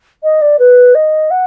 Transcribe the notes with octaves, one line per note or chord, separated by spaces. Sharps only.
D#5
D5
B4
D#5
F#5